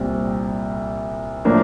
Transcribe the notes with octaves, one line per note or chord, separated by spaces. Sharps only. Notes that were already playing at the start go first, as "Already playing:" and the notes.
Already playing: C2 A#2 G3 C4
A2 F3 A#3 D4